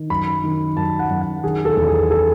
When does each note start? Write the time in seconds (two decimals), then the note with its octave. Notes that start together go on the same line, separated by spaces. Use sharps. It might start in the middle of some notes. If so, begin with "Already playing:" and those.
Already playing: D#3
0.10 F#2 B5
0.44 D#3
0.77 F#2 A5
0.99 F#5
1.10 F#2
1.21 F#5
1.43 D#3 G#4
1.65 A4
1.77 E2
1.88 G#4
2.10 A4